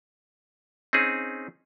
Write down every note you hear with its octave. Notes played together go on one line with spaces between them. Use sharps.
C4 C#4 D#4 G#4